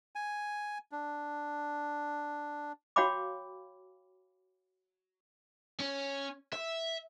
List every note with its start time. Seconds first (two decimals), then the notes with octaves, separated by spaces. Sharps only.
0.16 G#5
0.92 D4
2.96 F#4 C#5 F5 G5 B5 D6
5.80 C#4
6.53 E5